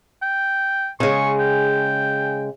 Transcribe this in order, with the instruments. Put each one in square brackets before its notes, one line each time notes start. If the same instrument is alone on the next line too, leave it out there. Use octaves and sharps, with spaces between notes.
[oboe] G5
[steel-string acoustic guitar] C#3 G#3 [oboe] C#6
[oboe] G5